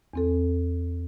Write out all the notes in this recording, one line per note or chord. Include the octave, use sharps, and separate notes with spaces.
E2 C4 A4